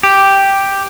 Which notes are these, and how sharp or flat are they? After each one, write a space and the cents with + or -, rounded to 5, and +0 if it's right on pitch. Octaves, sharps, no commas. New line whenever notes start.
G4 +0